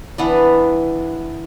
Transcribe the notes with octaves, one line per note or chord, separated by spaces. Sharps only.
E3 B3 D4